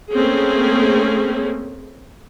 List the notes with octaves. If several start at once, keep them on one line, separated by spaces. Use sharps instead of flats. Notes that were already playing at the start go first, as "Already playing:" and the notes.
A3 A#3 C4 C#4 G#4